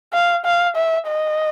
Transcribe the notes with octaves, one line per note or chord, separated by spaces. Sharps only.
F5
F5
E5
D#5